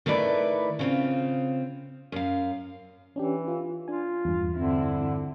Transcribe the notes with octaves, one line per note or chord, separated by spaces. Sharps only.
D#3 A3 E4 B4 D5
C#3 C4 F4
F#2 F5
E3 C#4 D4 G4
F4
D4 F4 G#5
E2 G2
D3 C4 E4